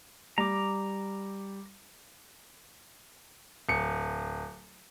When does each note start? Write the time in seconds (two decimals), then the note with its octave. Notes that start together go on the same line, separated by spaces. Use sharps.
0.38 G3 A#5 D6
3.69 D1 C#7